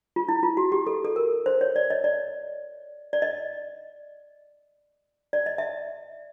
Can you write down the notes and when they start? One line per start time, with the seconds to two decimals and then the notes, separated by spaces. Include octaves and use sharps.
0.16 F4
0.29 E4
0.43 F4
0.57 F#4
0.72 G4
0.87 A4
1.05 A4
1.16 A#4
1.46 C5
1.61 C#5
1.76 D5
1.90 D#5
2.04 D5
3.13 D5
3.22 D#5
5.33 D5
5.46 D#5
5.58 E5